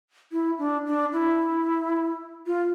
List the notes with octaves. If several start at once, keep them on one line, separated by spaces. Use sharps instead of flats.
E4
D4
D4
E4
F4